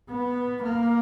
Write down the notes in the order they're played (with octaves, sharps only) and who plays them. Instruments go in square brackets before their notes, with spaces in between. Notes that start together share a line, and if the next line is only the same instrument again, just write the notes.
[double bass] B3
A#3